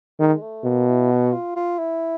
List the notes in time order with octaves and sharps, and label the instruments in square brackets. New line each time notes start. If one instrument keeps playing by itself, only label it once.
[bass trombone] D#3 [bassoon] G#3
[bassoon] A3
[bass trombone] B2 [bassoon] A#3
[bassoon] E4
F#4
F4
F4
E4